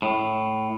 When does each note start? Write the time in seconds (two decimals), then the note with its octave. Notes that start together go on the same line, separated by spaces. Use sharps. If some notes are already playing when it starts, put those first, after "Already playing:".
0.02 A2